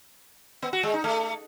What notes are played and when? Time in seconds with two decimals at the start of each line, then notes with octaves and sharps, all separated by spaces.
0.62 B3
0.73 F#4
0.83 G#3
0.94 D#4
1.04 A3